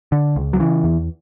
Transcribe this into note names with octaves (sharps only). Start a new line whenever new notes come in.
D3
C#2
F#3
C#3 E3
E2